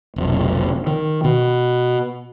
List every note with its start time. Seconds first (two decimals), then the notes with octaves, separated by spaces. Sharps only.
0.16 F1 B1
0.87 D#3
1.24 B2